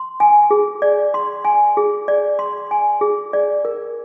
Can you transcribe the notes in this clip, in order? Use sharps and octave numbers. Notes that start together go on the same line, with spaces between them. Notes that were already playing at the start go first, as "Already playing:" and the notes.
Already playing: C6
G#5
G#4
D5
C6
G#5
G#4
D5
C6
G#5
G#4
D5
A#4